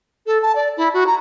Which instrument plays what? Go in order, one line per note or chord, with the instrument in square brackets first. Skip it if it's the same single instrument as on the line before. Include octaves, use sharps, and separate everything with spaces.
[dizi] A4
A5
D5
E4
F#4
A#5